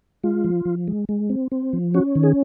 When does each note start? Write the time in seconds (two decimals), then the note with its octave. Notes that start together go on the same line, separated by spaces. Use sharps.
0.24 G#3 F4
0.44 F3
0.65 F3
0.88 G#3
1.09 G#3
1.30 C4
1.52 C4
1.73 F3
1.94 C#4 F#4
2.15 D#3
2.23 G#4